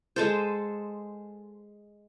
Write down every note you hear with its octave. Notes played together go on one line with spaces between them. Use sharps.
G#3 A4 C5